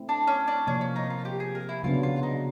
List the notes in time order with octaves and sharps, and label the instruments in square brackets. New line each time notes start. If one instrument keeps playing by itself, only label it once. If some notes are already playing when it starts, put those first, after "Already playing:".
Already playing: [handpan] A3 C4 E4
[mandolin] D4
C#4
D4
[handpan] C3 F3 A#3 [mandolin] C#4
[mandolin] C#4
D#4
F4
G4
G#4
A#4
E4
[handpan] C#3 F#3 B3 D4 [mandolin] F4
[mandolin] F4
D#4